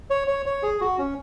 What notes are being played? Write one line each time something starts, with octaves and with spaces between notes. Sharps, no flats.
C#5
C#5
C#5
G#4
F#4
C#4